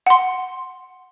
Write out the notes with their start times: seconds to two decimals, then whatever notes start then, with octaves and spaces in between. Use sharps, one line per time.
0.06 F#5 C6